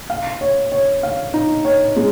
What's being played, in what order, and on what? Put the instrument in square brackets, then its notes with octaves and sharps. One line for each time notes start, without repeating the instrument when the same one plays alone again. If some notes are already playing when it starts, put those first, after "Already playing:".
[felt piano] F5
C#5
C#5
F5
D#4
C#5
G#3